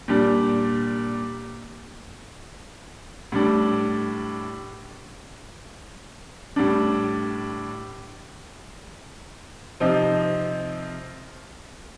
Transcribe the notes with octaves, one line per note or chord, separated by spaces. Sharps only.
A#2 G3 D4
A2 G3 D4
A2 G3 D4
C3 F3 C4 D#4